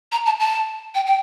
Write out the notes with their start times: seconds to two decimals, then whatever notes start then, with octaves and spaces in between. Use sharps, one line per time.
0.12 A#5
0.26 A5
0.40 A5
0.95 G5
1.06 G5